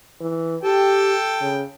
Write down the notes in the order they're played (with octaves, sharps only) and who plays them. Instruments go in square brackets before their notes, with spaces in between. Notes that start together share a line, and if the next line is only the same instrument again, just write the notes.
[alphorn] E3
[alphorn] G4 [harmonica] A4 G5 A5
[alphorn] C#3